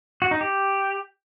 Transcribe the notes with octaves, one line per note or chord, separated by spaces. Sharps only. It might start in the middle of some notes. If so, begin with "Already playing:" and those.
F#4
D#4
G4